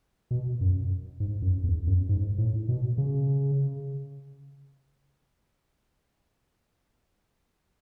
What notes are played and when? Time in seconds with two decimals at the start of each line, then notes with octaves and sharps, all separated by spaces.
0.31 B2
0.61 F#2
1.20 G#2
1.42 F#2
1.64 E2
1.87 F#2
2.09 G#2
2.38 A2
2.69 B2
2.98 C#3